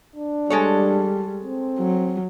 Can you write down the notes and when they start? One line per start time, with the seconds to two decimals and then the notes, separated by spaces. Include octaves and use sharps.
0.16 D4
0.50 G3 G#3 A4 C#5
1.43 C4
1.79 F#3